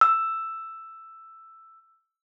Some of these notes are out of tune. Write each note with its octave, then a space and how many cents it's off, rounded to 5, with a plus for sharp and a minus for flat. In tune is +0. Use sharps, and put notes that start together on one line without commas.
E6 +5